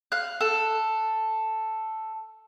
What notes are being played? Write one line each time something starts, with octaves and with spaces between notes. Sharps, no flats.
F5 F#6
A4